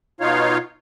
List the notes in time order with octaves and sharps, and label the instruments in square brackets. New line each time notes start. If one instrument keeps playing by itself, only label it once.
[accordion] B2 D#4 F4 C#5 F5